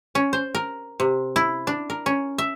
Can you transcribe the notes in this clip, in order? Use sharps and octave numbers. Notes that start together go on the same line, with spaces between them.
C#4
C5
A#4
C3
E4
D4
A#4
C#4
E5